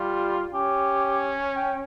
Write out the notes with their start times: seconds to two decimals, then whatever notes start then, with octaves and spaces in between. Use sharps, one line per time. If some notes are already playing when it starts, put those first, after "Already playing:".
Already playing: G3 F4
0.54 C#4 G4
1.56 G5